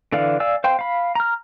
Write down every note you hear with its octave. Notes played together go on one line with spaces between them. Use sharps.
D3 E3 D5 F5
D5 F5 G#5 E6
C5 F5 G5 C6
F5 B5
A#5 F6